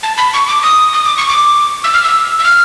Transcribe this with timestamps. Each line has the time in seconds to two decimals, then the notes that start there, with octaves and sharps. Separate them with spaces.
0.03 A5
0.17 B5
0.33 C#6
0.48 D6
0.63 D#6
0.93 D#6
1.05 D6
1.18 C#6
1.29 D6
1.84 E6
1.94 F6
2.04 E6
2.39 E6
2.44 F6